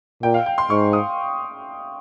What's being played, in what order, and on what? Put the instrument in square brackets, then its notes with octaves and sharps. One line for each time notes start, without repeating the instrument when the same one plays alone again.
[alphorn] A#2 [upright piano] G5
[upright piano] F5
G5
C6
[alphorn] G#2 [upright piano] C#6
[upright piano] D#6